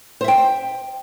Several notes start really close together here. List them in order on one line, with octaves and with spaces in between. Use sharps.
C5 E5 G5